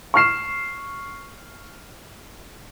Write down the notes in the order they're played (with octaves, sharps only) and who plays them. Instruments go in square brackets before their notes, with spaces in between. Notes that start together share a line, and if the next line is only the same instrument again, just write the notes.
[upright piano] C#6 F6 C7 E7